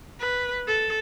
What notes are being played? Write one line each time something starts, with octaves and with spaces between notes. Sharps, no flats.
B4
A4